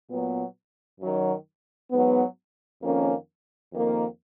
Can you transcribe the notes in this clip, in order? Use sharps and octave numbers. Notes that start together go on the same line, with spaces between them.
A#2 F#3 B3
F#2 D#3 F#3
G#2 F#3 B3
F2 D#3 A#3 C#4
F2 D#3 A#3